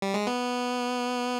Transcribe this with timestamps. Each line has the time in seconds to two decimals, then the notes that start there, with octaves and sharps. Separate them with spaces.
0.02 G3
0.14 G#3
0.27 B3